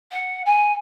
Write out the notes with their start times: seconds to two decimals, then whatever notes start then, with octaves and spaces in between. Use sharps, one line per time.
0.11 F#5
0.45 G#5